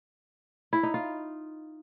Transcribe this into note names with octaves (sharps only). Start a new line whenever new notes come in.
E4
D#4
F4